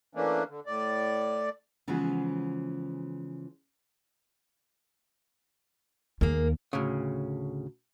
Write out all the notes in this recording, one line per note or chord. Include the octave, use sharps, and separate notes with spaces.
E3 A3 A#3 C#4 D4
D3
A2 D5
C#3 E3 F3 G#3 B3 F#4
D#2 A#3 G#4 A#4
D2 A2 C#3